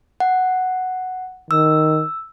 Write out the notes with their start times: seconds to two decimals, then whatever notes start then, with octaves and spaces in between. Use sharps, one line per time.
0.20 F#5
1.51 D#3 E6